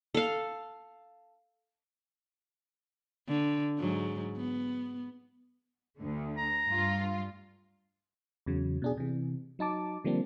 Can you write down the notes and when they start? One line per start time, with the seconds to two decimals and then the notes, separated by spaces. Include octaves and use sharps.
0.14 A4 F5
3.28 D3
3.79 G#2 F#3
4.36 B3
5.97 D2 D3
6.38 A#5
6.68 G2 F4
8.46 E2 C#3 F#3
8.82 B2 D4 G#4
8.97 C3 E3
9.59 F#3 D#4 A5 D6
10.05 D3 F3 G3 A#3 C4 D4